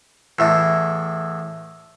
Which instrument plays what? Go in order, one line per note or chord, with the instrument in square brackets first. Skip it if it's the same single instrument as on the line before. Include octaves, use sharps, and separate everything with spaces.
[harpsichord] E2 A2 [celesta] E5 E6